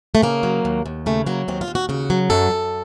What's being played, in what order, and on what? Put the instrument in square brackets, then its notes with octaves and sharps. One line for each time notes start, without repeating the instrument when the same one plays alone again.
[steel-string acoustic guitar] A3
C#3 A#3
F#3
D#2
D#2
C#3 A3
F#3 A#3
D#2 C4
F4
D#2
F#4
C#3 F#4
F#3
F#2 A4
F#2